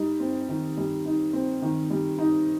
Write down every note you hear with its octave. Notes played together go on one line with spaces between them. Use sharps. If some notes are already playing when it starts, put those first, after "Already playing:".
Already playing: G3 D#4
C4
D#3
G3
D#4
C4
D#3
G3
D#4